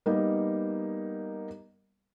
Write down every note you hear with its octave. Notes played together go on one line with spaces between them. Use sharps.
G3 A#3 B3 D#4